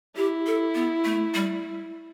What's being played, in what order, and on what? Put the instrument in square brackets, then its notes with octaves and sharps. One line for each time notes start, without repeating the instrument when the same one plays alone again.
[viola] E4 [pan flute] G4
[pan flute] A4
B3
A3
G3